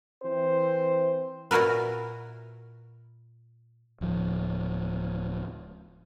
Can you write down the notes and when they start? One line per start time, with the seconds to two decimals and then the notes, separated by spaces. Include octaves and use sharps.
0.23 E3 C4 C5
1.51 A#2 E4 F#4 A#4 B4
4.01 D1 F3